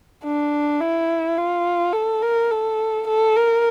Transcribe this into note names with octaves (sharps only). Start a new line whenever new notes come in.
D4
E4
F4
A4
A#4
A4
A4
A#4